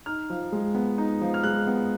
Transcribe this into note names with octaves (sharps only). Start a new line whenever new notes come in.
D#4 F6
F3
G#3
B3
D#4
F3
F6
G#3 F#6
B3